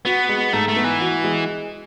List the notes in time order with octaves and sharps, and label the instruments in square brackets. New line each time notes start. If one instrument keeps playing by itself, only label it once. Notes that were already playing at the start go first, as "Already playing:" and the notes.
[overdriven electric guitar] B3 [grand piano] F#4
[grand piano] G#3
[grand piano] G#2 [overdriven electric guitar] A3
[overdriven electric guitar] A3
[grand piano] B3
[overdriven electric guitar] E3
[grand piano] F#4
G#3